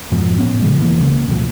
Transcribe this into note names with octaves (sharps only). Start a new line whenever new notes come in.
F2 G#2 B2 F3
A2 B3 C#4
A2 C#3 F3 G#3
E1 E3 A#3
C#2 C#3 A#3
D1 D2 B2 F3